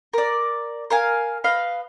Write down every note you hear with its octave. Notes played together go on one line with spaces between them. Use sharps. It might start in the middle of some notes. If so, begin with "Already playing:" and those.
A#4 D5
A#4 F5 G#5
B4 D#5 F5